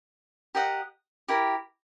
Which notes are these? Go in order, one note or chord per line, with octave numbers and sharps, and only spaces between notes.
G4 A#4 D#5 F#5
E4 G4 A#4